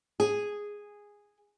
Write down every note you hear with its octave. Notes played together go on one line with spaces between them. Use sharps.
G#4